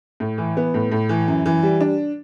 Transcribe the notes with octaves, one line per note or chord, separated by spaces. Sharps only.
A2
E3
B3
A2
A2
E3
F#2
E3
G3
D4